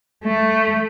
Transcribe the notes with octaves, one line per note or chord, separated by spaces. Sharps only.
A3